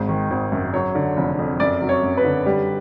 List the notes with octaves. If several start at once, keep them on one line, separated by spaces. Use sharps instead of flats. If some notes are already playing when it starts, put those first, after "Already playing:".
Already playing: G#1 G#2
D#3
G#1
F#2
F#3 C#5
D3
F1
F2
F#2 D5
F#3
C#5
F#2
B4
D3
G3